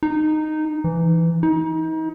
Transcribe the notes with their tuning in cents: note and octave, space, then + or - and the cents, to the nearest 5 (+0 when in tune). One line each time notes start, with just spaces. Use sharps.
D#4 -10
E3 +15
D#4 +35